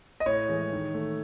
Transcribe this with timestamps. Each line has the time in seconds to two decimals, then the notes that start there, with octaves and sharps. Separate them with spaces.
0.20 D#5
0.26 A2 C#5
0.49 E3 G#3
0.72 D#3
0.94 A3